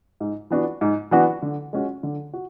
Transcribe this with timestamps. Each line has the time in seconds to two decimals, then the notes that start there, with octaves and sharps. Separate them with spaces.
0.20 G#2
0.50 E3 B3 D4 F#4
0.81 G#2
1.11 E3 B3 D4 F#4
1.42 D3
1.73 G#3 C#4 F#4
2.03 D3
2.33 F#4